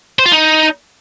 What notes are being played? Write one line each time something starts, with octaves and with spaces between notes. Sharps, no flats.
C5
F4
D#4